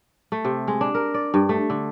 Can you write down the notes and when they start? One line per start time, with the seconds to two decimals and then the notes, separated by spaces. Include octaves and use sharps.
0.32 A3
0.45 C3
0.68 G#3
0.81 D4
0.95 A#4
1.14 D5
1.34 G2
1.49 A3
1.70 D3